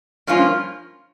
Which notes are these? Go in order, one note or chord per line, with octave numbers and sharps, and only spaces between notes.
G2 F3 A#3 C#4 F4